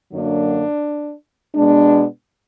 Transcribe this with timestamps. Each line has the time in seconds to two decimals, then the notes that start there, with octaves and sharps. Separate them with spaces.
0.12 F#2 D3 F#3 A#3 D4
1.54 B2 G#3 B3 D4